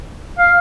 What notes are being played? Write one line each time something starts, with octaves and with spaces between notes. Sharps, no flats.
F5